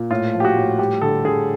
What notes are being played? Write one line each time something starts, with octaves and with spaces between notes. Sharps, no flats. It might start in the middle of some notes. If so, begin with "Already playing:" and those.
Already playing: A#2
A2 F4
F3
G4
F#4
A2
G3 G4
D3 A4
D3 G#4